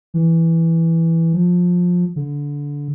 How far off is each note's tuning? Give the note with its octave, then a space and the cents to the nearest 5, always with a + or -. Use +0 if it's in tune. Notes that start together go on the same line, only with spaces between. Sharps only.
E3 +0
F3 +20
D3 -20